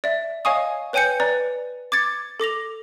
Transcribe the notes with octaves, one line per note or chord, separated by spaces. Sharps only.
D5 E5
C#5 D#5 F5 G#5 C#6 D#6
B4 C#5 G5 G#5 G6 C#7
B4 D5 A#5
D6 G#6 A6 C#7
A4 D6 A#6 F7